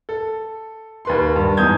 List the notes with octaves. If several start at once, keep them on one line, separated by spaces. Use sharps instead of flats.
A4
D#2 B4 C6
G2
E2 G#2 D#6 G6 G#6